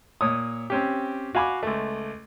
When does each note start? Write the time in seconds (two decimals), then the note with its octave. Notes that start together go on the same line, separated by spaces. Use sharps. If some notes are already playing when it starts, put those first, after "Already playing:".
0.21 A#2 C#5 D#6
0.70 C4 C#4 G4
1.35 F#4 F5 G#5 B5 D6
1.63 C#2 A3